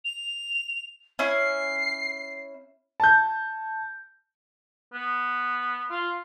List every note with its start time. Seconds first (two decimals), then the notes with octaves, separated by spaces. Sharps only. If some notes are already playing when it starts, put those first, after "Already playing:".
0.04 F7
1.19 C#4 E4 C7
3.00 A5 G6
4.94 B3
5.91 F4